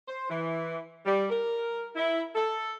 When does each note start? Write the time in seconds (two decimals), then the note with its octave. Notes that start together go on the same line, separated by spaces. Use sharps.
0.08 C5
0.30 E3
1.06 G3
1.30 A#4
1.96 E4
2.35 A4